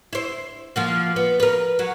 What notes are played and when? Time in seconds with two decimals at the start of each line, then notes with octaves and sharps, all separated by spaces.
0.13 E4 C5
0.76 F3 A#3 F#4
1.16 B3
1.40 A#4 B4
1.79 F#3 F#4